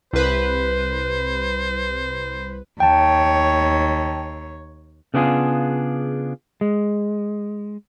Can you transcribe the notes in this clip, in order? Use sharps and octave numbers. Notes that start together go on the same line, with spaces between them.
C2 B4 C5
D#2 C#5 G5 A5
C#3 B3 D4 F4 G#4
G#3